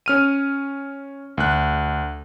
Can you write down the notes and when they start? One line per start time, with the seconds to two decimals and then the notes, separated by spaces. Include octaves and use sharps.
0.06 C#4 F6 D#7
1.37 D2 F#6